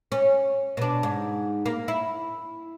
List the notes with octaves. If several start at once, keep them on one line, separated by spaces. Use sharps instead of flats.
C#4
B2 D4
G#2
A#3
E4